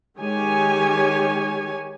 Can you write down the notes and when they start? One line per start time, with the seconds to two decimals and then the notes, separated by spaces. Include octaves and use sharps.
0.19 D#3 G#3 G4 C#5 G#5